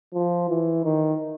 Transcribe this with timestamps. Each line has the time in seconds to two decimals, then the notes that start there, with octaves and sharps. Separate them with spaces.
0.14 F3
0.49 E3
0.84 D#3